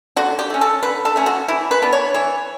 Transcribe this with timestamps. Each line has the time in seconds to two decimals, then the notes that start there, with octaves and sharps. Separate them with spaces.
0.16 D3 F#4
0.39 G4
0.50 A3 C#4
0.61 A4
0.83 D3 B4
1.05 A4
1.16 A3 C#4
1.26 F#4
1.48 E3 E4
1.71 B4
1.82 B3 D4
1.93 C#5
2.14 E3 C#5